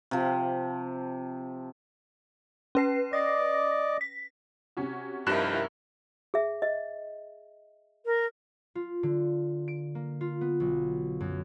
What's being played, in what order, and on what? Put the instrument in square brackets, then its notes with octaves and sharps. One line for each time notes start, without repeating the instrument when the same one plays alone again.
[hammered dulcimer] C3 F3
[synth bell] C#4 B4 C7
[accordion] D5 D#5 D6 [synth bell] A#6
[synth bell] B6
[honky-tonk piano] C3 C#4 F#4
[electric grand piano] G2 F#6 E7 [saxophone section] F3 D#4 G4 [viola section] E4 A#4
[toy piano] G#4 E5
D#5
[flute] A#4
[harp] F4
D3
D7
A#3
F4
B3
B1
F#2